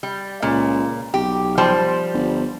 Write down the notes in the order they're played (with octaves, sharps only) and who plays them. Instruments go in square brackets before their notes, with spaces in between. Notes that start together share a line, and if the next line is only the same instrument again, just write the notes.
[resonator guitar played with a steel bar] G3
[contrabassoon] C#2 [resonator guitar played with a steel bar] A#2
[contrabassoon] B1 [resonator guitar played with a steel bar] G4
[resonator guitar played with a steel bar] F3 G3 C5
[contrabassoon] G1